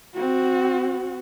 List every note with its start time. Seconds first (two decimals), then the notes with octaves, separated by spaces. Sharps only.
0.14 C4 F#4